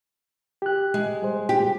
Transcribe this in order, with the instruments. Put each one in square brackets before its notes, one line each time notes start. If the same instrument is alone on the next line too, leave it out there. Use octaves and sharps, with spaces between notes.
[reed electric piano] G4 F#6
[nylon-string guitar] G#3
[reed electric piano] G3 G#4 C5
[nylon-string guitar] G4